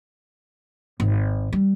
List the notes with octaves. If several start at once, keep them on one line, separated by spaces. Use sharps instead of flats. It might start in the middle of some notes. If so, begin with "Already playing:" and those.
G#1
G3